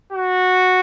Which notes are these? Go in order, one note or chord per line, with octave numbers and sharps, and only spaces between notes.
F#4